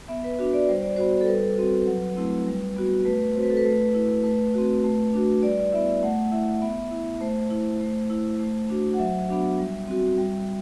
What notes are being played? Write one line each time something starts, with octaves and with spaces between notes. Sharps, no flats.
B3 E5
B4
D4 F#4 E5
D5
G3 C5
D5
B3 F#4 C5
A4
G3 B4
C4 F#4
F#3
A3 C4 E4
G3
B3 F#4
A3 B4
C4 F#4 C5
B4
A4
B4
A3
E4
A3 B4
C4 F#4
A3
D4 F#4
G3 D5
D5
B3 E4 E5
E5
A3 F#5
E4 E5
B3 E5
E4
A3 C5
E4
A3
E4
A3
D4 F#4
F#5
F#3 E5
B3 D4 F#4
G3
C4 F#4
G3